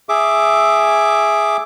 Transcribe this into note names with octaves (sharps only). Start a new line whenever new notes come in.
G#4 E5 D6